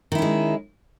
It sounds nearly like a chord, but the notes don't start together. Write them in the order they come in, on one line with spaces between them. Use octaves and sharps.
D#3 E4 C#4 G#3